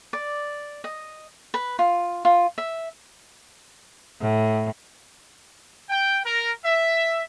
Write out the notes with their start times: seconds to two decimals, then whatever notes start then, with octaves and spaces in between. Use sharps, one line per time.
0.13 D5
0.84 D#5
1.54 B4
1.79 F4
2.25 F4
2.58 E5
4.21 A2
5.90 G5
6.25 A#4
6.65 E5